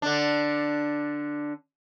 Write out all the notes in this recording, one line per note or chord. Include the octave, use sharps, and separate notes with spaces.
D3 D4